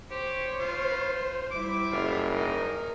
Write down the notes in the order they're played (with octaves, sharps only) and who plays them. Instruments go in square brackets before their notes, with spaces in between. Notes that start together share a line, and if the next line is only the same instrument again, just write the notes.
[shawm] G4 [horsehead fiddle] C5 [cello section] C#5
[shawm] F4
[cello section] G3 E4 [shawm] D6
[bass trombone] F#1 [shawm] F4
[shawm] D#4 [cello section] A#4